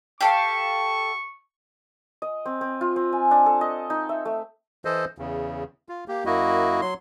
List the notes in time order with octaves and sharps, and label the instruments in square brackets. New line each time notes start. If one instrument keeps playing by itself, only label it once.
[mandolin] G4 A4 F5 [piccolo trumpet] C#6
[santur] D#5
C4
C4
F4
C4
G#5
D4
A4
D#5
D#4
E5
A3
[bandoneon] E3 A4 C5 D#5
E2 C#3
F4
A#3 G4
F#2 A#3 E4 F#4 D#5
F#3 C6